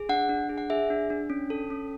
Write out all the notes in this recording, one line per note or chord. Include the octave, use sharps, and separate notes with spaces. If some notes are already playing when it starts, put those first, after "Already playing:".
Already playing: G#4
D4 F#5
D4
G#4
F#5
G#4 E5
D4
D4
C#4
A4
C#4